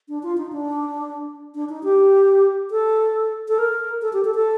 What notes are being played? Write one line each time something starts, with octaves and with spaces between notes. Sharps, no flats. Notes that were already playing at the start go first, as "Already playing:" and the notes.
D4
F4
D#4
D4
D4
D#4
G4
A4
A4
A#4
A4
G4
A4
A4